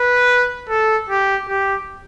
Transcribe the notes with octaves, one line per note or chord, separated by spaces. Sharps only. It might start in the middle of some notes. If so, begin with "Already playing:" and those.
Already playing: B4
A4
G4
G4